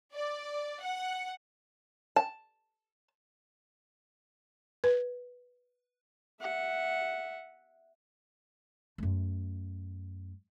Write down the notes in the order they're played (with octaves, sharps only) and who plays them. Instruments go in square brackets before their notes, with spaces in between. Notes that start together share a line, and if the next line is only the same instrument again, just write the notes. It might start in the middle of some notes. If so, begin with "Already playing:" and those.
[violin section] D5
F#5
[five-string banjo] A5
[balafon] B4
[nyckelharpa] E5 F#5
[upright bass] F#2 A3